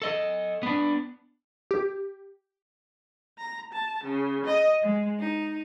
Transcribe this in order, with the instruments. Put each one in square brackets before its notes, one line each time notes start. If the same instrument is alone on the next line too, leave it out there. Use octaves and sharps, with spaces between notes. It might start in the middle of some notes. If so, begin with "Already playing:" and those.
[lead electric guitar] A4 D#5
B3 D4
[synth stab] G4
[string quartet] A#5
A5
C#3
D#5
G#3
D#4